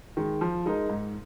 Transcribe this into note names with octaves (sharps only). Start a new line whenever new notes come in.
D#3 G#3
F3
G#3 D#4 A#4
G#2